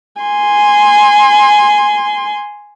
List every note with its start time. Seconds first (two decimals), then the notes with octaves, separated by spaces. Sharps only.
0.21 G#5 C6